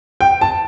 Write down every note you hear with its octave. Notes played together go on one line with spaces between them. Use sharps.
G5
A5